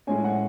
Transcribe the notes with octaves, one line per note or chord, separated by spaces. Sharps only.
A2 G#3 C#4 G#5
F#5